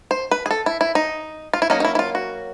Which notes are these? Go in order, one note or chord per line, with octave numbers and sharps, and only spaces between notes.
C5
B4
G#4
A4
E4
E4
D#4
F4
E4
F#3 A#3 C#4 D#4
D#4
E4
E4
F4
F#4